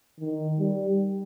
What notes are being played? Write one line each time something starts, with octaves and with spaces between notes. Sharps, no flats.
D#3
G3